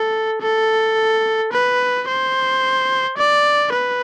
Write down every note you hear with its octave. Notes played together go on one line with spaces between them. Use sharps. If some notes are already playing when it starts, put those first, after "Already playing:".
Already playing: A4
A4
B4
C5
D5
B4